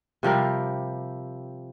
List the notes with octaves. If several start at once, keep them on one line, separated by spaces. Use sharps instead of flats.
C3 F3 G3 A#4